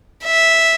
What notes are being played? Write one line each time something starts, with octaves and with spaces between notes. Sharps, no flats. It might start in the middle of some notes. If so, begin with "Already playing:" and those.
E5